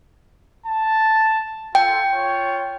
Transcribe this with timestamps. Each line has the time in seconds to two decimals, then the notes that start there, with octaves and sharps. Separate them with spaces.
0.67 A5
1.75 F4 A4 G5
2.13 F4 C#5